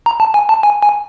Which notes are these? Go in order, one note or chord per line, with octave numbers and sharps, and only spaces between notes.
A#5
A5
G#5
A5
G#5
G#5